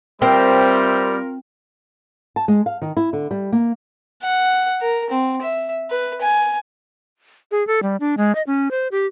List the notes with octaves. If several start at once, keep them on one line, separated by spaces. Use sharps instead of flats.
G3 C4 F4 A#4 C5 E5
A5
G#3
F5
D#3
E4
D3
G3
A#3
F#5
A#4
C4
E5
B4
G#5
G#4
A4
G3
D4
G#3
D#5
C#4
C5
G4